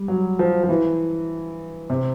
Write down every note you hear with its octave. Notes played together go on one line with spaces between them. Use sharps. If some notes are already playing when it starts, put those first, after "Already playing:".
Already playing: G3
F#3
F3
F3
E3
C3